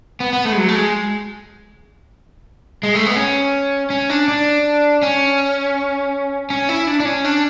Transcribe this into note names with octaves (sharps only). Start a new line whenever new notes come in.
B3
B3
A3
G#3
F#3
A3
G#3
G#3
A3
B3
C#4
C#4
D4
D4
C#4
C#4
E4
D4
D4
C#4
D4